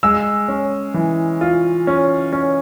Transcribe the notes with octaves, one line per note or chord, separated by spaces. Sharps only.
G#3 E6
C#4
E3
F4
C#4
C#4